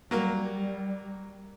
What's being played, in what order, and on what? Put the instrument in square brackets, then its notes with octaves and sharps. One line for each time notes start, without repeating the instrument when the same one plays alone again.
[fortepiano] F#3 A#3 A#4 [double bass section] G3